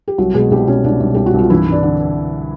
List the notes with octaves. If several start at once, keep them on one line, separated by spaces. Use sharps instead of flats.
G4
C2 F#3 F#4
B2 G#3 G#4
C2 G3 G4
B2 C#4
C2 D4
C2
C2 G4
F#4
C2 F4
G2 E3 E4
G2
D4
D3